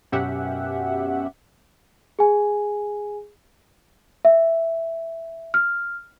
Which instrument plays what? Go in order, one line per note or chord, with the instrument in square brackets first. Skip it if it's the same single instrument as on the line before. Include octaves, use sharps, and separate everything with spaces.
[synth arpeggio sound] F#2 B2 C#4 G4 E5 F#5
[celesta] G#4 G#5
E5
F6